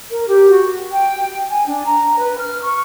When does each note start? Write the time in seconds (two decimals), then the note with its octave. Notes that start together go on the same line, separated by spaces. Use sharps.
0.11 A#4
0.28 G4
0.49 F#4
0.91 G5
1.47 G#5
1.67 D4
1.85 A#5
2.17 B4
2.39 F6
2.62 C#6